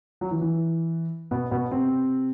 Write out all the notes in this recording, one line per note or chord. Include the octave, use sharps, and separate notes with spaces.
F#3
E3
E3
B2 B3
B2 B3
C3 C4